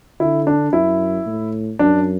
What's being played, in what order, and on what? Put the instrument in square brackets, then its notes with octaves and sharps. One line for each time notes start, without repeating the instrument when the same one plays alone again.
[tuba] D3 [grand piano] E4
[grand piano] D4
[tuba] F#2 [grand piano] E4
[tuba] A2
[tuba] F#2 [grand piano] D4